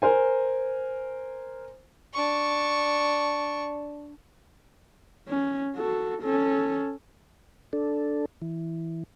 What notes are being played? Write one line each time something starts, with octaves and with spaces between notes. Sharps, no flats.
A#4 C5 G#5
D4 C#6
C#4
F#4 A4
C#4 A4
D4 A4
E3